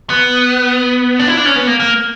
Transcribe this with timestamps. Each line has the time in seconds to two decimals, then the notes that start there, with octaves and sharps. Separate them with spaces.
0.10 B3
1.19 D4
1.28 E4
1.37 D4
1.46 C#4
1.56 B3
1.67 A#3
1.80 A#3